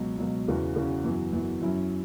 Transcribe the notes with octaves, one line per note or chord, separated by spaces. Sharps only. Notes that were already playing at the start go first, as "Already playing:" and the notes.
Already playing: C#2 B2 F#3
C#2 B2 F#3
E2 C#3 E3 C#4 F#4
E2 C#3 E3 C#4 F#4
F#2 E3 B3 F#4
F#2 E3 B3 F#4
F#2 F#3 C#4 E4